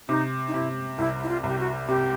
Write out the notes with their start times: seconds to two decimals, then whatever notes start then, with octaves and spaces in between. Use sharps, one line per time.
0.09 C3 D#4
0.48 D#4
0.54 C3 E4
0.98 C2 E4
1.23 E4
1.29 F4
1.43 C2 G4
1.59 F#4
1.88 C3 G4